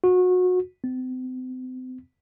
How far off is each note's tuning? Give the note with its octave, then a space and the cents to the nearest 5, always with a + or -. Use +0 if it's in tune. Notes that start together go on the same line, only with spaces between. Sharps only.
F#4 -25
C4 -40